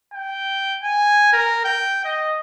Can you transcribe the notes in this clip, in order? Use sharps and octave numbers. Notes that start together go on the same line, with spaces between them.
G5
G#5
A#4
G5
D#5